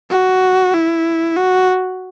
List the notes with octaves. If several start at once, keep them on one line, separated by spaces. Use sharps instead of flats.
F#4
E4
F#4